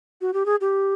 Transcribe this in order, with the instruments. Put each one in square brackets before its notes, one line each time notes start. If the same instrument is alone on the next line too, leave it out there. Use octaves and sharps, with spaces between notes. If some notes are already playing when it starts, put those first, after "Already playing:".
[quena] F#4
G4
G#4
G4